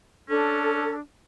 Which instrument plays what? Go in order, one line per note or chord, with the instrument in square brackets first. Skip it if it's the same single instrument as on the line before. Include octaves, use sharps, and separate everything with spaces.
[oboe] C#4 [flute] D4 [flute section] A4